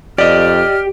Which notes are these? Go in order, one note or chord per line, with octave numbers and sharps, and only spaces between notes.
F2 G4 D5 D#5 F6